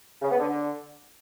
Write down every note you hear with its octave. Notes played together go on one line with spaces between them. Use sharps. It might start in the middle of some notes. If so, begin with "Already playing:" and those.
C#3
B3
D3